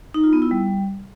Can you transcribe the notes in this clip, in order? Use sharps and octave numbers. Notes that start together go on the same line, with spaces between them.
D#4
F4
B3
E4
G3